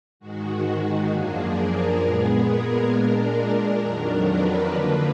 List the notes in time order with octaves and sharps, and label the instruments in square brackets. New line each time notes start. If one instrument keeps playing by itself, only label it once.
[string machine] G#2 D#3 G#3 F#4
F#2 F3 A#3 D4 G#4
A#4
A#2 G#3 B3 G#4
A#4
A#2 G#3 D4
F2 D#3 F#3 D4
B4
D3 F3 A#3 D4